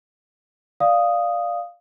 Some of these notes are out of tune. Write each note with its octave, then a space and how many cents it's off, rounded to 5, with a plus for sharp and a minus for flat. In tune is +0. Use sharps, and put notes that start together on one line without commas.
D5 +0 F5 +0 D#6 +0